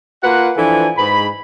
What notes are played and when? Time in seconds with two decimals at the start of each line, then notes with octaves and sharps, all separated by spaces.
0.23 A#3 F4 B4 F#5
0.57 E3 F3 D4 A4 G#5
0.97 G#2 B5